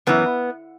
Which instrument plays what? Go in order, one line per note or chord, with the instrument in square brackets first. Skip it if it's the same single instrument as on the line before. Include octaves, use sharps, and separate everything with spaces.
[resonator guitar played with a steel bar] F#2 E3 B3